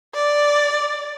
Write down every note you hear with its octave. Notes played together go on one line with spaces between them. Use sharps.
D5